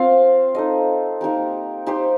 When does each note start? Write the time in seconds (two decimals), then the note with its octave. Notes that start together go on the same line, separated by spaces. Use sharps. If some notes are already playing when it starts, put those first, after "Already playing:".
Already playing: C4 F4 C5 F5
0.55 D#4 A4 D#5
1.21 A#3 D#4 G4 A#4
1.86 D#4 G4 C5